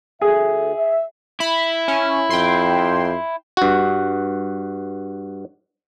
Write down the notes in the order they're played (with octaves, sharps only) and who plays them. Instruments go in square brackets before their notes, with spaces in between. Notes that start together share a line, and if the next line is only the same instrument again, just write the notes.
[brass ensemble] D2 A4 E5 [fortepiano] G#4
[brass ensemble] E5
[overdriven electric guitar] E4 [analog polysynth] B5
[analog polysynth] C#4
[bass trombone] F2 [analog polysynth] G5 C6
[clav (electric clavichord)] G2 F#4